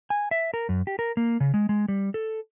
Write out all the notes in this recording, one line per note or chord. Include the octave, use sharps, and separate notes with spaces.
G#5
E5
A#4
F#2
G4
A#4
A#3
C#3
G#3
G#3
G3
A4